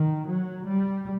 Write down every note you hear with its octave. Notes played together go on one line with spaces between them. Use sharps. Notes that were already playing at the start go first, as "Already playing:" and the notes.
Already playing: D#3
F#3
G3